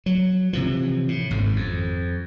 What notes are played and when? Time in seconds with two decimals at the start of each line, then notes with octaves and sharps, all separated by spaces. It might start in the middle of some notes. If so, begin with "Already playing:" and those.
0.06 F#3
0.53 C3 E3 F3
1.08 A2
1.31 G#1 G#2
1.56 F2